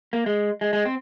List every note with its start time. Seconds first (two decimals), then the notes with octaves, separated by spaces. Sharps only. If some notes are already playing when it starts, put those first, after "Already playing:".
0.13 A#3
0.26 G#3
0.61 G#3
0.73 G#3
0.85 C4